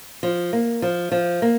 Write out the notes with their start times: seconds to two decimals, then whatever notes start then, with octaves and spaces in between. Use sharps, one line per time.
0.23 F3
0.53 A#3
0.82 F3
1.12 F3
1.42 A#3